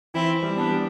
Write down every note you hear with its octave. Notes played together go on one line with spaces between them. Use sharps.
E3 C4 E4
G3
B3 D4
G3